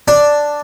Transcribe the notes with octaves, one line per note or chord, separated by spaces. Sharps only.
D4